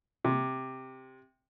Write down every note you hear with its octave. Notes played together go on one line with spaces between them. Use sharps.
C3